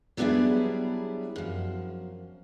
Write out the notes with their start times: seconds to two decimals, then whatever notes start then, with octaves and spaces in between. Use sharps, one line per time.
0.17 F#3 G3 B3 D4 E4 G#4
1.36 F#2 F3